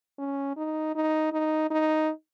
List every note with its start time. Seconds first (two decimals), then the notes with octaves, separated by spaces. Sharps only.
0.18 C#4
0.57 D#4
0.95 D#4
1.32 D#4
1.70 D#4